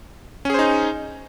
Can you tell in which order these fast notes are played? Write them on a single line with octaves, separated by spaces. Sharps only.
C#4 G#4 C5 D#4